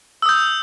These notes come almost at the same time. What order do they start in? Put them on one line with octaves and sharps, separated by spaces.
E6 D#6 G6